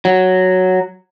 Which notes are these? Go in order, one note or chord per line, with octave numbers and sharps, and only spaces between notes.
F#3